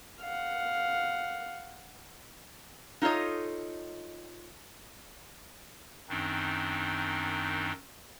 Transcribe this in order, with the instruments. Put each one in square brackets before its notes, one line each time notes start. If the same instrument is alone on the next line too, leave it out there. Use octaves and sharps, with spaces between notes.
[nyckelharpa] F5 F#5
[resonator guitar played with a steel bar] D#4 F4 A4 C#5 D#5
[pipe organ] F#2 D#3 C4 D4 D#4